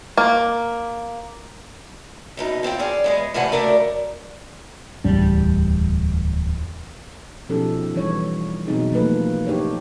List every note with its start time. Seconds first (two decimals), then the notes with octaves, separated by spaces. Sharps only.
0.17 A#3
2.37 F#2 B2 D#4
2.63 F#2 C4 F4 G5
2.79 C#4 G#4 D5
3.04 E2 G#3 B3
3.34 A2 C3 E3 G3 F#5 G#5
3.52 D2 C#3 A3 A#4 D5
5.04 D1 E2 G3 D4
7.49 B2 F3 C#4 D#4 G4 A4
7.95 E3 G3 D4 C#5
8.67 B2 F#3 C4 D#4 G#4
8.92 E3 F3 A3 A#3 A4 B4
9.47 D4 D#4 G4 A#4 C#5